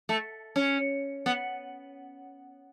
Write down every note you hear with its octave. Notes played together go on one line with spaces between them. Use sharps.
A3
C#4
B3